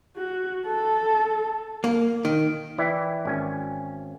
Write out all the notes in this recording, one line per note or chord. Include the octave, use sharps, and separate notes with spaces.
F#4
A4
A#3
D#3
E3 E4 D5 E5 G5
G#1 C#4 G#5